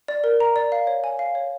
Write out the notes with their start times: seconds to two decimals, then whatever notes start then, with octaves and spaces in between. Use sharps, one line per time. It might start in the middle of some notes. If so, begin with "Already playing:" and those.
0.08 D5
0.24 A#4
0.40 A#5
0.56 D5
0.72 F5
0.87 C#5
1.04 G#5
1.19 F5
1.35 C#5